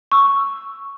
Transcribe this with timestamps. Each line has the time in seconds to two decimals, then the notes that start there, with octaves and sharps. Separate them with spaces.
0.12 C#6 E6